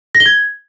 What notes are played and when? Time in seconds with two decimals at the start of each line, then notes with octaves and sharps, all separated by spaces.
0.15 A#6
0.20 G7
0.26 G#6